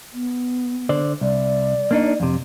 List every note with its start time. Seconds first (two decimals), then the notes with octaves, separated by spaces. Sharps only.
0.14 B3
0.89 D3 C5 D5
1.21 C2 D5
1.91 A#3 D4 D#4
2.20 F2 C3